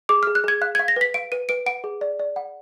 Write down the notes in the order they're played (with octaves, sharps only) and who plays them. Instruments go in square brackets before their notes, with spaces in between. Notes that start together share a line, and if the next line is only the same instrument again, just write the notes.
[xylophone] G#4 D6
G#4 F6
F#6
G#4 G#6
F5 F#6
F5 G#6
A#6
B4 B6
F5 D7
B4 D#7
B4 D7
F#5 D7
G#4
D5
D5
F#5